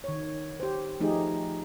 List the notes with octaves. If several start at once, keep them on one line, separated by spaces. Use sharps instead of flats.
D#3 C#5
G4 C5
F3 A3 D#4 G4 G#4